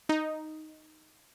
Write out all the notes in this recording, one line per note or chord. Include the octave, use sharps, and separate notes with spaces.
D#4